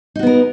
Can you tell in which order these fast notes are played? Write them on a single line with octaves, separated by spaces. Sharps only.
D#4 F#4 B3 A#4